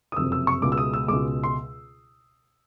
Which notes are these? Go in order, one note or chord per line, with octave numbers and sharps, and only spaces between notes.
D#6
F#1 F2 C3 E6
E6
C#6
C#2 B2 G#3 D6
E6
D#6
E6
C#2 B2 G#3 D6
C6